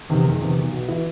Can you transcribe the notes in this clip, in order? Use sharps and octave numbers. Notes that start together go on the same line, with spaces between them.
E2 C3 D#3
F#1
E2 C3 D#3
B1
B2
E3 E4